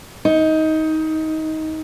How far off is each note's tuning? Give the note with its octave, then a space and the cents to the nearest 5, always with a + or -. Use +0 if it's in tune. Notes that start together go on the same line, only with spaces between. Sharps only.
D#4 +15